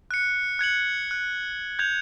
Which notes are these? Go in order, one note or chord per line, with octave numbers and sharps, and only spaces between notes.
F#6 C#7
F#6 G#6 C#7 F#7
F#6
G6 G#6 F7